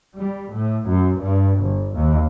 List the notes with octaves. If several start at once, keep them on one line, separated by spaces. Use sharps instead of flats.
G3
A2
F#2
G2
G1
D#2